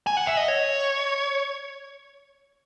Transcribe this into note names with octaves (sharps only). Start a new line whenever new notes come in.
G#5
F#5
E5
D#5
C#5